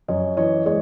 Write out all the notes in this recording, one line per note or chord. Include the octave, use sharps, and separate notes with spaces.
F#2 C#5 D#5
E3 C#5 D#5
G#3 C#5 D#5